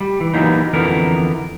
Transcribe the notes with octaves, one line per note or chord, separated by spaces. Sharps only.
G3
E3
E3 F#3 G3 A#3 B3 D#4
F2 D3 E3 B3 A#4